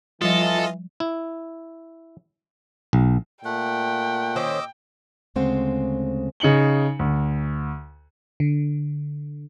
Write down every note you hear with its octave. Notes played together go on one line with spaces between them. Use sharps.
E3 F3 G3 F4 A4 D#5
E4
B1
A#2 A3 F#5 G5
D#3 C#4 C5 D#5 D6 E6
D2 C#3 G#3 C4 C5 F#5
C#3 D#4 C#7 F#7 G7
D2
D3